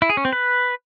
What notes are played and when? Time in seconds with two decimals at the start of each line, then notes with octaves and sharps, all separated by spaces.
0.02 E4
0.10 G#4
0.17 C#4
0.25 C4
0.33 B4